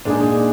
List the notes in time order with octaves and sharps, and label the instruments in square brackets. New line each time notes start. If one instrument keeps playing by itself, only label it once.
[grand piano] A#2 G#3 D#4 G#4 [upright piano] D4